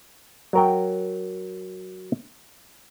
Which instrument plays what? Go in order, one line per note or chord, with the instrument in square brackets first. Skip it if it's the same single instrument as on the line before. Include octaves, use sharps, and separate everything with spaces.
[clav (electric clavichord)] F#3 A#4 G5